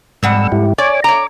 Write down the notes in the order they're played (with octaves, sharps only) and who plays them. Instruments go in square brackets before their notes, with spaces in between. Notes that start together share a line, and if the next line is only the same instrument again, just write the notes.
[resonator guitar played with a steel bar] F2 G3 F#5 [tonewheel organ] G#2 E6
[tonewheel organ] G#2 E4 G4
[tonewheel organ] C#5 G#5 D6 [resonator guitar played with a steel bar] D5
[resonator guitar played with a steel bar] C#5 A#5 [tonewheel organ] D6